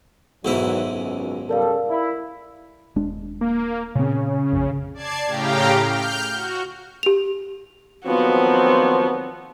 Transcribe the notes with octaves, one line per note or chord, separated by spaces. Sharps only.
B1 G#2 D#3 E3 F#3 E4
G#1 C#2 F#2
C#3 G3 A4 A#4 D5 F5
E4
D#1 G#3 D4
A#3
A#2 C#3 C4
A#1 F#2
D5 A5 G#6 C7
A2 C#3 G4 F5 G5 A#5
F6 G6
F#4
G4 F7
D#2 F3 F#3 B3 C4 F#4